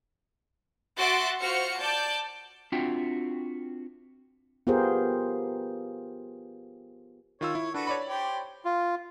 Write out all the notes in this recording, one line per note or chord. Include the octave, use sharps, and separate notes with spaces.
F#4 E5 C6 F#6 A6 D7
F4 F#4 C5 F6 C#7
D5 A5 G6
C4 D4 F4 F#4 E5 G5
B3 F4 G4 G#4 A#4 C5
D#3 F4 C#5 E6
E4
D4 F#4 A4 B4
C#5 D5 B5
G4 C5 G5
F4